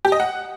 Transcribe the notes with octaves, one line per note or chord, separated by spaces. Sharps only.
G4
D#5
F#5